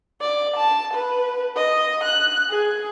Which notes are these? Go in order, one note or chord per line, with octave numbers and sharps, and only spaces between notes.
D5
A5
B4
D#5
F#6
G#4